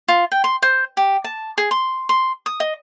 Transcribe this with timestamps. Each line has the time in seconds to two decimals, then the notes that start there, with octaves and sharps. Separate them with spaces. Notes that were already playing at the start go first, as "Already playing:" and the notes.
0.08 F4
0.32 G5
0.44 C6
0.62 C5
0.97 G4
1.24 A5
1.58 G#4
1.71 C6
2.09 C6
2.46 D#6
2.60 D#5